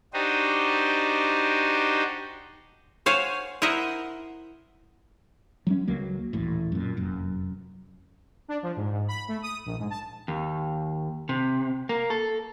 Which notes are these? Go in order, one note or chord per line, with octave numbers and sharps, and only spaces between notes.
D4 D#4 F#4 G4 C5 D#5
C5 C#5 F5 F#5 G#5
E4 A#4 C5 D#5 E5 F#5
F#3 G3 C#4
C#2 F#3 A#3
D#1 A1 A2
F#2 A#2
F1 F#2
D4
F3
G#2
G#2
B5
A3
D#6
A#1
G#2
A5
D#2
C3
A#3
A4